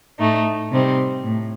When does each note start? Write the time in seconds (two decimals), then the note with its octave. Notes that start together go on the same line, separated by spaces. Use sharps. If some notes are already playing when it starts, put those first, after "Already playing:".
0.19 A2 A3 D#4
0.72 C3 G3 C4 D#4
1.25 A2